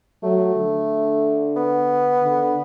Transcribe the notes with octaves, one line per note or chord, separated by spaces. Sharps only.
F#3 A3
D3
B3
D3